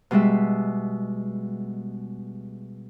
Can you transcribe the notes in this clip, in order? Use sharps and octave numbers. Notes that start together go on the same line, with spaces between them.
B2 G3 G#3 E5